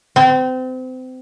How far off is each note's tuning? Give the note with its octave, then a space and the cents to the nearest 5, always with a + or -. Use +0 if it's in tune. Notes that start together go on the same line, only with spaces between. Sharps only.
C4 -30